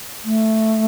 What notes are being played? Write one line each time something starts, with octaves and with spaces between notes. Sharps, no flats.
A3